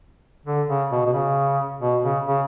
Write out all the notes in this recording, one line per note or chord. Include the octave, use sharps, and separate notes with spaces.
D3
C#3
B2
B2
C#3
B2
C#3
C#3